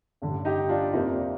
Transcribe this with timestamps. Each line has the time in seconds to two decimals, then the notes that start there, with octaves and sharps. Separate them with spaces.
0.22 A1 G2 D3
0.45 D#4 G4
0.69 D4 F4
0.93 F2 C3 F3 A#3 D#4